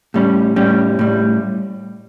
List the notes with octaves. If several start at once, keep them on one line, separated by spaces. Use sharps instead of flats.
A2 G3 C#4
A2 G3 C#4
A2 G3